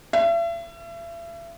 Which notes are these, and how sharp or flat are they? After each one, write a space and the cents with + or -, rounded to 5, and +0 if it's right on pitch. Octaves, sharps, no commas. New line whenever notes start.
E5 +40